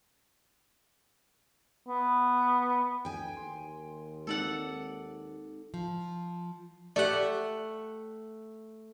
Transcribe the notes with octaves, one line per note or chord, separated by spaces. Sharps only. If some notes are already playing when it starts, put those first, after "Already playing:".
B3
D2 G5 G#5
D#2 C6
G#3 C4 D#4 A4 D5 F#5
F3
A3 G4 D5 F#5